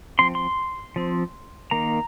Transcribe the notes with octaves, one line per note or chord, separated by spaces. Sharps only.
F3 C4 C6
C6
F3 C4
D#3 A#3 A#5